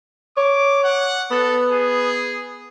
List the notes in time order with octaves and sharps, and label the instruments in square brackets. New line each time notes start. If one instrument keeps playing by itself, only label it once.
[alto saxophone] C#5 [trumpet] D6
[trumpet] F#5
[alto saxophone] B3 [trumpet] A4
[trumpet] G#4